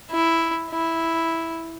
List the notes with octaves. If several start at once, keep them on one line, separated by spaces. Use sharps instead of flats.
E4
E4